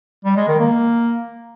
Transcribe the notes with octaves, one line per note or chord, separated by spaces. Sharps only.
G3
G#3
D#3
A#3